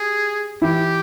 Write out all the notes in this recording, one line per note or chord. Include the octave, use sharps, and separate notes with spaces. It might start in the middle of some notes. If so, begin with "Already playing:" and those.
Already playing: G4 G#4
E3 E4 G4